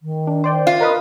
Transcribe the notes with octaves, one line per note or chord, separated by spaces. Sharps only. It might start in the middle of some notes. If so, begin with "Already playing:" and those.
D#3
D4
C5 D5 G5
F4
A#4 B4 D#5 D#6